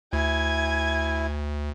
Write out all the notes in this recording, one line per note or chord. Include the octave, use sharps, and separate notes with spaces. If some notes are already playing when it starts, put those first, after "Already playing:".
D2 E4 G#5 G#6